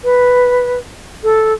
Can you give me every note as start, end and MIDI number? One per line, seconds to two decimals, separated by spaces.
0.04 0.78 71
1.23 1.53 69